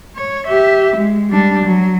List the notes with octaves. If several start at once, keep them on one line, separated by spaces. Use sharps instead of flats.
C#5
G4 E5
G#3
G3 D4
F#3